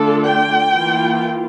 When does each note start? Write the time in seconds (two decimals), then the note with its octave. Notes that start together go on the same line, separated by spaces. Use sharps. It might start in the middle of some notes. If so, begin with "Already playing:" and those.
Already playing: D3 A3 D4 F4 A4
0.27 G5
0.73 E3 A#3 F4